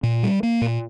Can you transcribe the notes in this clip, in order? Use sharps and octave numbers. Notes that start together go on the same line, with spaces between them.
A#2
G3
A#3
A#2